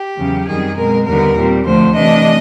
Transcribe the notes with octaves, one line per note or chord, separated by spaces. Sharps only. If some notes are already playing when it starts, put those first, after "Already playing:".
Already playing: G4
E2 C#3 F#3
F#2 D#3 G3 C4 G#4
B2 G#3 C4 A#4
D#2 D3 G3 B3 A#4
A#2 G3 C4
D2 D3 F3 A3 C5
C3 E3 A3 D4 D#5